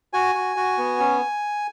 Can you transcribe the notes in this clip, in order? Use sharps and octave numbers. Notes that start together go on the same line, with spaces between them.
F#4 G#5
F#4
F#4
B3
C#4